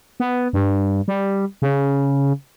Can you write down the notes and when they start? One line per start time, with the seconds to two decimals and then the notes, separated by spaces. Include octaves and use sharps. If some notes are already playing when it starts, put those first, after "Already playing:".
0.20 B3
0.53 G2
1.08 G3
1.62 C#3